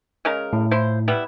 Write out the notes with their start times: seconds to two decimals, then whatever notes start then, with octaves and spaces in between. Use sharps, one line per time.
0.25 C#3 G#3 A#4
0.53 A2
0.71 F3 E4 C5
1.08 G3 B3 E4